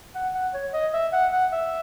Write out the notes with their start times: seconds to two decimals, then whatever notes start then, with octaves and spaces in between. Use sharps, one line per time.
0.15 F#5
0.34 F#5
0.54 C#5
0.73 D#5
0.94 E5
1.13 F#5
1.32 F#5
1.52 E5